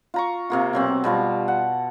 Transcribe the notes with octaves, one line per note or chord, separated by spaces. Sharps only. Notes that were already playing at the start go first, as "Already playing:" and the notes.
F4 A#5 C#6
C3 A#3 F4
B2 F#3 C4
B2 G3 F4 A5
F#5